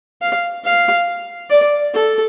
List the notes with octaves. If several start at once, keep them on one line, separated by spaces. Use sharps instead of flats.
F5
F5
D5
A4